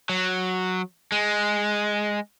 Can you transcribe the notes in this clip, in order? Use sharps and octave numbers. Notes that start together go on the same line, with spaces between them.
F#3
G#3